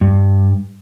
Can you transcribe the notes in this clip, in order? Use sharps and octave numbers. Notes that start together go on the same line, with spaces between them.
G2